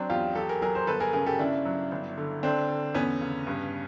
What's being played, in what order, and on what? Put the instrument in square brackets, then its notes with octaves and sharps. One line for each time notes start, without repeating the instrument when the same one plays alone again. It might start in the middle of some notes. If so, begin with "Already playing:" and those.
Already playing: [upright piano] F#3 C4 D4
E2 F4 G4
F#3 G4 A4
G#4 A#4
F#3 G#4 A#4
A#4 C5
G1 A4 B4
G#4 A#4
C#3 G#4 A#4
G4 A4
C#3 D4 E4
F#3
G1
D3
D3 C4 D4
D3
E2 B3 C#4
C#3
G2